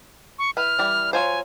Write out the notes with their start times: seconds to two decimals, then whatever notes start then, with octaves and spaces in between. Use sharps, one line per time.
0.39 C#6
0.57 E4 B4 F6
0.79 E3 G3
1.13 F#3 F4 C5 G#5